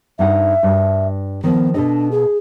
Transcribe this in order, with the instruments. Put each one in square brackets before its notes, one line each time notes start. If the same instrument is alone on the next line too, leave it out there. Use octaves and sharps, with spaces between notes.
[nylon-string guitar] G2 D#4 F#5 [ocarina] E5
[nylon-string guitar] G2
[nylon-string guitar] D#3 F3 [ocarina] B3
[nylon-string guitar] B2 A4 D#5 [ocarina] D4
[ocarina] G#4